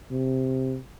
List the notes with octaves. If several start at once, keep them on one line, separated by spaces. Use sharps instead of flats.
C3